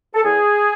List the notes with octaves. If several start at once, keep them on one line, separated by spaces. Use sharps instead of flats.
A4
E2 G#4